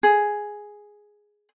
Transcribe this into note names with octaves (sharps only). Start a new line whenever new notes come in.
G#4